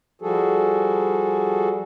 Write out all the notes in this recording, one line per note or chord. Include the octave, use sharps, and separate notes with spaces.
F3 G3 F#4 G#4 A4